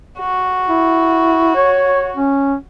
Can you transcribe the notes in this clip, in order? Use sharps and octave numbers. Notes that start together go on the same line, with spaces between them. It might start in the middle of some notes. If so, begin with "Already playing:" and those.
F#4
E4
C#5
C#4